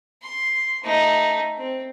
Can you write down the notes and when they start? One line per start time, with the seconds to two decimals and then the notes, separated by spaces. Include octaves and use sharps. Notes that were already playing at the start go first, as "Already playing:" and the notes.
0.22 C6
0.83 A3 D#4
1.57 C4